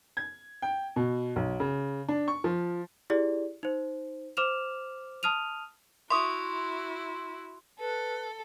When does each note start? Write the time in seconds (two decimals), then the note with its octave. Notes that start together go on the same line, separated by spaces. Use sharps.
0.17 G#6
0.62 G5
0.96 B2
1.36 B1
1.60 C#3
2.09 D4
2.28 C#6
2.44 F3
3.10 E4 G4 G#4 D5
3.63 D#4 C5
4.37 C5 D6 F6 E7 F7
5.23 A5 D#6 F6 D#7 F7
6.10 E4 F#4 E5 C6 C#6 D#6
7.80 A4 B4